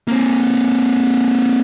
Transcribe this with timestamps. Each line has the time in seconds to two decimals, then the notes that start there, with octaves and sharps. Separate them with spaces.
0.08 A#3 C4